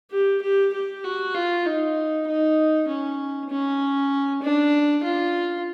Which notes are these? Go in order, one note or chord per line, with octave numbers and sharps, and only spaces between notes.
G4
G4
G4
F#4
F4
D#4
D#4
C#4
C#4
D4
F4